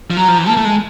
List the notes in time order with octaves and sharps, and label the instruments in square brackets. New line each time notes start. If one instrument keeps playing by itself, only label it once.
[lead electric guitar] F3
[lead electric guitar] F#3 [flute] A#5
[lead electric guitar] F3
E3
[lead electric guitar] A#3 [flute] A5
[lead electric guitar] A3
G#3